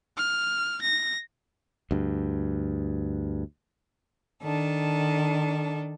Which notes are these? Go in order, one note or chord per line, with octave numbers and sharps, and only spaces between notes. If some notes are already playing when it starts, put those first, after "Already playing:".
F6
A#6
D2 G2
D#3 D4 A4